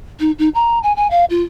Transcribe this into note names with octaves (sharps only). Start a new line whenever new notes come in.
D#4
D#4
A#5
G#5
G#5
F5
F4